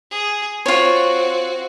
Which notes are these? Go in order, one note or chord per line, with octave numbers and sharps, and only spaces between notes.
G#4
C4 F4 F#4 C#5